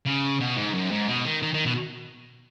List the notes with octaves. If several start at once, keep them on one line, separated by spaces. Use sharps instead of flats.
C#3
B2
G#2
F#2
G#2
B2
D#3
D#3
D#3
B2